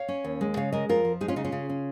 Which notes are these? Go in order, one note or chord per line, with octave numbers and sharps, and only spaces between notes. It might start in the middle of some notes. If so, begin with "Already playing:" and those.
Already playing: C#5 F5
C#4
D#2
G#3
C#3 C#5 F5
G#3 A#4 D#5
F2 F4 A#4
F3
G#3 D#4 G#4
C#4 F4
C#3 D#4
C#4 F4
C#3
C#4